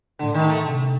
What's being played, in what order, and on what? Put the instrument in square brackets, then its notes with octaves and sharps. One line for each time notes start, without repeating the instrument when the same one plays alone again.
[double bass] A2 [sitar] D3
[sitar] D#3
A3
[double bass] C3